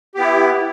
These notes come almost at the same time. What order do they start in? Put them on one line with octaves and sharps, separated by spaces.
G4 B3 E4